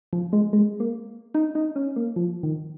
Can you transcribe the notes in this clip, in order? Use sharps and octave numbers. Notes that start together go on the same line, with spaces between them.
F3
G#3
G#3
A#3
D#4
D#4
C#4
A#3
F3
D#3